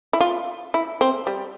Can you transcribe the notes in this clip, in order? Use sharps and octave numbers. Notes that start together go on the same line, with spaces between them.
E4
F4
E4
C4
G3